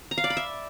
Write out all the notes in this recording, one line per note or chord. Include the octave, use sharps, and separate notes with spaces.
A#5
F5
D5
B5
E5